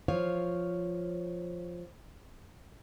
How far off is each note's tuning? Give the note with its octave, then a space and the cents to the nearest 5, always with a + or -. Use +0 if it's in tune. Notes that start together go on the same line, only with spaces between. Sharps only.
F3 +0 C#5 +0 F5 +0